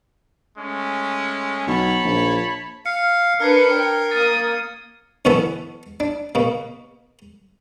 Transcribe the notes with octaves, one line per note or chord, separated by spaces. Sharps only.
G#3 A3 C#4
B1 C#5 A5 B5
A#1
F5 C#7
D4 A#4 B4 F6 G#6 C7 C#7
G5
A#3 D#6 A6
F#2 B2 E3 B3 A4 A5
D4
B2 A#3